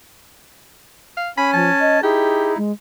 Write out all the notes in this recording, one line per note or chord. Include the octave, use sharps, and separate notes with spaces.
F5
C#4 G#5 B5
F3 A5
D#5
D#4 E4 G4 G#4
G#3